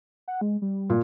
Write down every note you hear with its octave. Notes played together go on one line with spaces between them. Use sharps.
F#5
G#3
G3
A#2